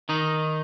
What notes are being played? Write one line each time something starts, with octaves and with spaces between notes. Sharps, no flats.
D#3 D#4